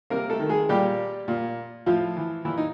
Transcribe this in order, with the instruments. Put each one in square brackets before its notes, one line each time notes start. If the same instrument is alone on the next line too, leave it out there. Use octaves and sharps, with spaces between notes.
[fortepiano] C3 A#3 A#4
A3 A4
D#3
G#3 G#4
A#2 G3 G4
A#2
A2 F3 F4
E3
A#2 E3 E4
D#4